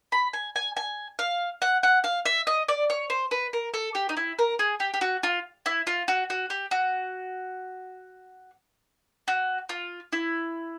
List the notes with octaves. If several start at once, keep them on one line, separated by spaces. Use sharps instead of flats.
B5
G#5
G#5
G#5
F5
F#5
F#5
F5
E5
D#5
D5
C#5
C5
B4
A#4
A4
G4
D#4
E4
A#4
G#4
G4
G4
F#4
F4
E4
F4
F#4
F#4
G4
F#4
F#4
F4
E4